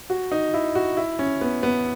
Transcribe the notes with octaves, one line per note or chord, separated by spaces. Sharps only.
F#4
D#4
E4
F#4
E4
C#4
B3
B3